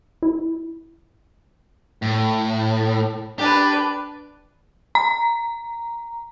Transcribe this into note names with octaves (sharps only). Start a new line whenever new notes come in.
E4
A2
D4 G4 B4
A#5